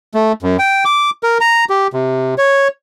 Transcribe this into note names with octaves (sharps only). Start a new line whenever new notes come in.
A3
F#2
G5
D6
A#4
A#5
G4
C3
C#5